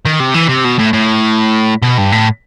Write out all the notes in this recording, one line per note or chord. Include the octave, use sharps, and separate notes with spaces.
D#3
C3
E3
C3
B2
A2
A2
B2
G2
A2